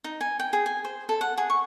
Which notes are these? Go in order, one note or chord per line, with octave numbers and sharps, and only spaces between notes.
D#4
G#5
G5
G#4
G#5
C5
A4
F#5
G#4
C#6